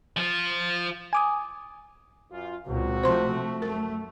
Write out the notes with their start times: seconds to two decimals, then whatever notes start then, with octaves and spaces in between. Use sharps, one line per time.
0.17 F3 F4
1.13 G#5 D6 D#6
2.31 F#2 F4
2.67 C#2 A#2 C4 F#4
3.03 C3 F3 A3 C5 C6
3.33 A3
3.62 F#2 A3 A#4